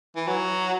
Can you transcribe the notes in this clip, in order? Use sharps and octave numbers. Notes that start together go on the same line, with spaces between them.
E3
F#3